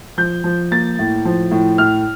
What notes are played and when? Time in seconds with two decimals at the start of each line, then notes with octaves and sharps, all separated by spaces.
0.17 F3 G6
0.44 F3
0.71 A#3 A6
0.99 A2
1.25 F3
1.51 A2
1.78 A2 F6